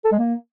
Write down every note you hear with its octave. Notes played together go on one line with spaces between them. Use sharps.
A4
G#3
A#3